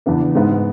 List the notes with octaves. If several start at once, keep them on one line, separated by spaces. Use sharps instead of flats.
E2 C#3 E3 B3 D4
G#2 G#3 B3